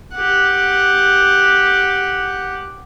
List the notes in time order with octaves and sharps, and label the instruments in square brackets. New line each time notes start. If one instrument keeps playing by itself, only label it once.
[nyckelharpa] G4 F#5